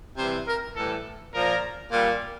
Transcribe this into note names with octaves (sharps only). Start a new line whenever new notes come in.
C3 E3 G3 C5
A#4
A2 E3 G3 A4
A#2 F3 A#4
A#2 G3